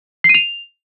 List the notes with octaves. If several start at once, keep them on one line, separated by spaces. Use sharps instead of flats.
C7
D#7
F7